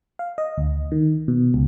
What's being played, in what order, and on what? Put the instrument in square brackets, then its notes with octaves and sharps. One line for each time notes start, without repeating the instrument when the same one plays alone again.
[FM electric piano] F5
D#5
D2
D#3
B2
C#2